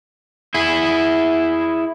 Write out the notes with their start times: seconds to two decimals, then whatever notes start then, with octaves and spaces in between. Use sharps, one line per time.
0.54 E4 G#4